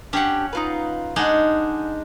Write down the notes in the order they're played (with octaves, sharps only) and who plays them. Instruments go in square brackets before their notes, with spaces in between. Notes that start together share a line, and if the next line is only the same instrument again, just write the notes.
[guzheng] C#4 F#5 [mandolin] D4 G4 G5
[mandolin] D#4 F4 B4
[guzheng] G#3 D4 D#4 [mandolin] F#5 G#5